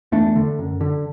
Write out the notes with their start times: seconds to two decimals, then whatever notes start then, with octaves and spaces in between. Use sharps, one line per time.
0.12 E2 A3 D4
0.36 D3
0.59 F#2
0.81 D3